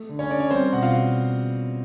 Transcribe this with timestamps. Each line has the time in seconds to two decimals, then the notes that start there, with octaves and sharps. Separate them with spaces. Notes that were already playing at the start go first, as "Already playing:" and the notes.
Already playing: A3
0.09 D3
0.19 C#4 C#5
0.30 D3 D5
0.40 C#5
0.51 G3 C4 C5
0.73 B2 F#5
0.83 F4 F5